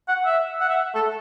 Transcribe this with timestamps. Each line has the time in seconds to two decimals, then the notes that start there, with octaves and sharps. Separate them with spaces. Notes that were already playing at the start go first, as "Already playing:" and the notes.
0.08 F#5
0.25 E5
0.60 F#5
0.69 E5
0.95 A4